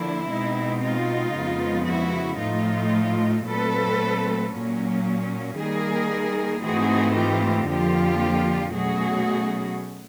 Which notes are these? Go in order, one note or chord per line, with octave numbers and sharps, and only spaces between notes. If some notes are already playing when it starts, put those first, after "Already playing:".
Already playing: D3 F3 A#3 D4 E4
B2 G#3 C4 D#4
D#4 F4
F2 C#3 F3 G#3 B3
E4 F#4
A2 F3 A3 D#4 F4
A#2 F#3 A3 C4 A4 B4
A#2 F#3 A#3 C#4
D#3 G3 A#3 G#4 A#4
G#2 E3 A3 C4 D#4 F#4 G#4
F4 G4
F2 D3 F3 A#3 F4 G4
B2 F#3 A3 C#4 F#4 G#4